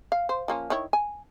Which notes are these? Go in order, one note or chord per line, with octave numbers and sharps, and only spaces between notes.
F5
C5
F3 A#3 C#4
D#3 E4 C#5
G#5